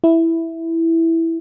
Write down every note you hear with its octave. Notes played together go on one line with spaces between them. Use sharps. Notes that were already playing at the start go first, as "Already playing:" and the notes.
E4